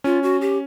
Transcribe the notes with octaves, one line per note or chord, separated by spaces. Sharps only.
C#4 F4
F#4
G4